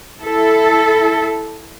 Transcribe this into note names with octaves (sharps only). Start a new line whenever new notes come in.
E4 A4